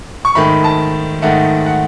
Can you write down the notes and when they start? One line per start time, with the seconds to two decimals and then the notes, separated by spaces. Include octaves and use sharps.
0.25 C#6
0.35 G#2 D#3 A3 B5
0.64 A5
1.22 G#2 D#3 A3 F#5
1.66 F#5